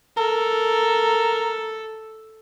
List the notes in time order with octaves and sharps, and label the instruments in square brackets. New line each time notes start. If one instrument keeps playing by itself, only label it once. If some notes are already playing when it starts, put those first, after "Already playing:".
[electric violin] A4 [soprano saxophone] A#4